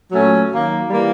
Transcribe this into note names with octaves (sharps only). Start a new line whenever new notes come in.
A#2 F#3 A3 C#4
D#3 F#3 A#3
E3 G3 A#3